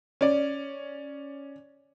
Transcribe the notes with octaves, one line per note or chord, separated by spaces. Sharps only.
C#4 D5